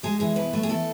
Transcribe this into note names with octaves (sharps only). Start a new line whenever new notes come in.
G#3 G#4
E3 G#4
B2 B4
A3
G#4
E3 A4